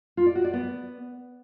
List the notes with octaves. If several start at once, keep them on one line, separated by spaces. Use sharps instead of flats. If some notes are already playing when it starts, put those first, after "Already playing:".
F4
D5
F#4
D5
B3